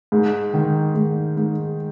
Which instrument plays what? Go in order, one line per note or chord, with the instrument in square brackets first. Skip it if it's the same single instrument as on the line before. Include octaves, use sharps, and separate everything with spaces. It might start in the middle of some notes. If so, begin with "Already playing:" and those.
[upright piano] G#2
D#3
G#2
G#2